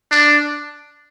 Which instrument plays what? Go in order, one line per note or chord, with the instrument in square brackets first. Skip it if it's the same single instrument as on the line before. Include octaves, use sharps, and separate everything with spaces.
[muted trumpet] D4